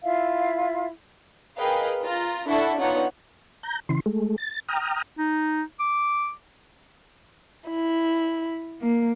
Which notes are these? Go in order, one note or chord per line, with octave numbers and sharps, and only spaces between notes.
E4 F4 E5 F5
G#4 A#4 B4 D#5 F5 G5
F4 A#5
D4 E4 A4 E5 F#5 C#6
B3 D4 D#4 F4 C#5 F#5
A#5 G6
C#3 E3 C6
G#3 A3
A6
G5 A#5 D#6 F6
D#4
D6
E4
A#3